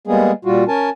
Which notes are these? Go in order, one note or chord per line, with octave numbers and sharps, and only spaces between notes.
G3 G#3 A#3 B3 G#4
A#2 G3 F4 F#4
C#4 A#4 G#5 A5